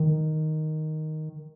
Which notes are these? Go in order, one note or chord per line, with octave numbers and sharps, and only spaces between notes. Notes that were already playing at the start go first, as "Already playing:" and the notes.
Already playing: D#3